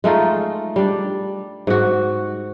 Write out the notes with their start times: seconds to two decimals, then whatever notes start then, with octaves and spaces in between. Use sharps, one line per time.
0.04 G#3 A3 D#4 F4
0.76 G3 D4
1.67 G#2 F#4